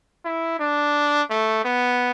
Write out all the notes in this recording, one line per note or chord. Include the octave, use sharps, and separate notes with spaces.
E4
D4
A3
B3